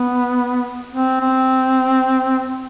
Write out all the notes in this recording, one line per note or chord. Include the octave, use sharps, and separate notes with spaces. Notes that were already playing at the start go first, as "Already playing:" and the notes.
Already playing: B3
C4
C4